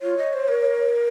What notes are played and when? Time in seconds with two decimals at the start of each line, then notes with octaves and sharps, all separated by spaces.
0.01 F4 C#5
0.17 D#5
0.33 C5
0.48 A#4